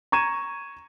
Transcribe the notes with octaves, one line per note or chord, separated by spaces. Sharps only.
A#5 C#6 G#6 D#7 E7